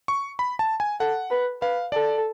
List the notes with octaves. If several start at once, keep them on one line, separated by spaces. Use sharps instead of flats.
C#6
B5
A5
G#5
A4 F#5
B4
B4 F5
A4 D5